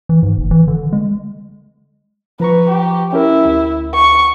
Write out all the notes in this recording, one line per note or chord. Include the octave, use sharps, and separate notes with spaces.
E3
G#2
F#1
E3
D3
G#3
F3 B4 A#5 C#6
G4
C#4 E4 G4 A#4
D2
C#6